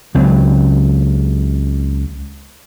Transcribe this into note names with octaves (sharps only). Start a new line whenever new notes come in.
C#2 F#3 C4